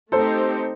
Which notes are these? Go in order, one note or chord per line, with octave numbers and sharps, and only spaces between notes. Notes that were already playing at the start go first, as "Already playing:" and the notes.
A3 C4 D#4 G4 A4 C5